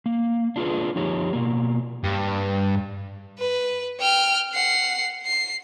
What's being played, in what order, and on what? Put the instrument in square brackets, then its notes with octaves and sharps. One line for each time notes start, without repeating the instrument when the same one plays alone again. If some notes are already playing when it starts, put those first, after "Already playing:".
[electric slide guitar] A#3
D4 F4 G#4 B4
F3 D#4 G4 C#5
B2 A#3
[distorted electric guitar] G2
[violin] B4
G5 F6
F#5 C7
C7